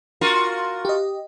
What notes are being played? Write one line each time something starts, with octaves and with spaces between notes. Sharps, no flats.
F4 F#4 A#4
G4 D#5